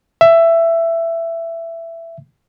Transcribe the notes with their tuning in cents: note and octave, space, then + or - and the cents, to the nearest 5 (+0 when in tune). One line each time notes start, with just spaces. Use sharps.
E5 +15